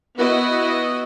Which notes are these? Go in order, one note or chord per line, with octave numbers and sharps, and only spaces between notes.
B3 E4 F#4 D#5